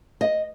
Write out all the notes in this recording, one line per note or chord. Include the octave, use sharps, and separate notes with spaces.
D#5